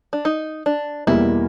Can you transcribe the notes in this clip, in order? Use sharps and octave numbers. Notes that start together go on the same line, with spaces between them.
D4
D#4
D4
E2 B2 G3 A#3 E4